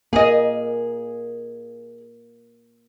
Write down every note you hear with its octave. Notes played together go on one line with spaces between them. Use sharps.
A#3 G#4 D#5